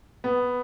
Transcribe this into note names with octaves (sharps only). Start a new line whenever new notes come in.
B3